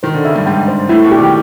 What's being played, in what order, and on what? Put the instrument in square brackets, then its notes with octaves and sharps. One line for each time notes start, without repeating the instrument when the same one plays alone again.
[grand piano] D#3 [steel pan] C5
[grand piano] D3
[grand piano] C#3 [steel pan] E5
[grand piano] G2
[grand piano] G#2 [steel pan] G5
[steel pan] C5
[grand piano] A2 [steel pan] E4
[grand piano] B2
[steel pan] G4
[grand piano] D#3